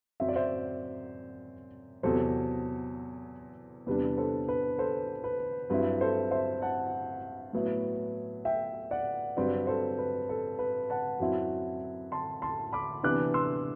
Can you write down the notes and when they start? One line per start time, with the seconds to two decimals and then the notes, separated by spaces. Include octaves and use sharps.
0.20 F#2 F#3 C4 E5
0.29 D5
0.36 C5 E5
2.03 E2 C3 F#3 A4 C5
3.87 E2 C3 G3 D4 B4
4.17 A4 C5
4.48 B4
4.78 A4 C5
5.24 B4
5.70 G2 F#3 C4 E4 B4
6.01 A4 C5
6.31 C5 E5
6.62 F#5 A5
7.53 A2 F#3 B3 E4
8.45 E5 G5
8.91 D5 F#5
9.37 G2 F#3 C4 B4 D5
9.67 A4 C5
9.98 B4
10.29 A4
10.59 B4
10.90 F#5 A5
11.20 F#2 F#3 C4 E4
12.12 A5 C6
12.42 A5 C6
12.73 B5 D6
13.03 C3 E3 B3 D4 D6 F#6
13.34 C6 E6